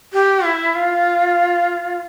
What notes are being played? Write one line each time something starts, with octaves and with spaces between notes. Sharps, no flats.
G4
E4
F4